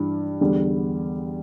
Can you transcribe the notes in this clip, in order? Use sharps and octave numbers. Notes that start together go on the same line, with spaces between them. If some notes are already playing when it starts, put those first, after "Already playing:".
Already playing: G2 E3 G3
E2 D3 G3